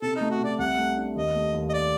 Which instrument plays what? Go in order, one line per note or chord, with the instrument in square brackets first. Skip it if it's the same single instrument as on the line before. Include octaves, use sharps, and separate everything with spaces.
[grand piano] C3 [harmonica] A4
[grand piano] A3 [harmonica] D#4
[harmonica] F#4
[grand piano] C3 [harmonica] D5
[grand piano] C2 [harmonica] F#5
[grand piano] A3
D4
[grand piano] D#2 [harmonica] D#5
[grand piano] A3
D#2
[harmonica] D#5
D5